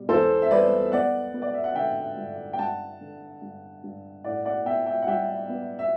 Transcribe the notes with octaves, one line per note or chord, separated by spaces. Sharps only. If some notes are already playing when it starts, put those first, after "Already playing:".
Already playing: B2 G3
E2 A4 C5
E5
G3 B4 D5
B3 D5 F#5
B3
D5
E5
F#5
D3 E5 G5
G2
G5
G2 F#5 A5
D3
G2
G2
A2 D5 F#5
D5 F#5
B3 E5 G5
E5 G5
F#5
G3 E5 G5
B3
E5